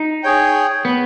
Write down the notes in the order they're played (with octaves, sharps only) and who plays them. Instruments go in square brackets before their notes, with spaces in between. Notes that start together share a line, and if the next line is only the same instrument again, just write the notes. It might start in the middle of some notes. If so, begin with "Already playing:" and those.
Already playing: [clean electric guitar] D#4
[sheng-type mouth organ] G#4 C#5 G5
[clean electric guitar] B3